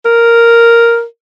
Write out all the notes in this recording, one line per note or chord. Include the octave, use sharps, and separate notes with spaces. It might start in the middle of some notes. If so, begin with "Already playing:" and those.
A#4